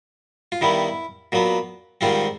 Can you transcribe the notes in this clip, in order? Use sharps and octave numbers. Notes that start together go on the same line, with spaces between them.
F4
G2 D#3 G3 B3 E4
A#2 F#3 B3
G#2 D#3 G3 C4 F4